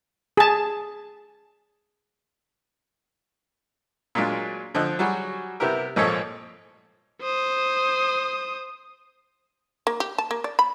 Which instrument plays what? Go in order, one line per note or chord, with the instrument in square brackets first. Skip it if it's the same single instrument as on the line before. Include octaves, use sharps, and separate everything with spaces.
[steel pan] G#4 A5
[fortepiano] A#2 F#3 G#3 D4 F4
D3 F3 D#5 F#6
F#3 G3 F#4 G#4
C3 B3 E4 G4 A#4
G#1 A#2 F3 A4 C#5 D#5
[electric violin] C5 D#6
[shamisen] A#3
G4
A5
A#3
D5
B5